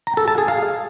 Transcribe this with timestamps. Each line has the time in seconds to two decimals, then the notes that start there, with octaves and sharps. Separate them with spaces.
0.07 A#5
0.17 A4
0.28 A5
0.38 G#4
0.48 F5